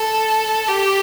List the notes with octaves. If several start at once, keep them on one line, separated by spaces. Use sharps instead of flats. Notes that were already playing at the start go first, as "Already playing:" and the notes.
Already playing: A4
G4